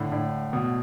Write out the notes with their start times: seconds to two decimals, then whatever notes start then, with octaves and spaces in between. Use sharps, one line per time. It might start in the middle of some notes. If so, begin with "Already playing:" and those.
Already playing: A2 D3
0.12 A2 D3
0.53 B2